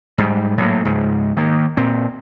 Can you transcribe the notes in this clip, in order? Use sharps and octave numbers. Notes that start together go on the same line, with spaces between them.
G#2 G3
A2 F#3 A#3
C#2 G#2
D#3 A#3
A#2 C4